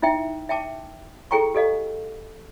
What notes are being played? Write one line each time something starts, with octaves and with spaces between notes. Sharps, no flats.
D#4 E4 E5 G5
E5 G5 A5 D6
E4 G#4 A4 G5 A#5 C#6
G4 A4 D#5 F5